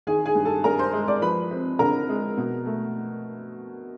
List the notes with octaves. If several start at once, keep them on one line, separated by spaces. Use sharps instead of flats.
D#3 G#4 G#5
G#4 G#5
G2
A4 A5
G2 A#4 A#5
C5 C6
G#3
D5 D6
F3 B4 B5
C4
D3 A#4 A#5
G#3
B2
A3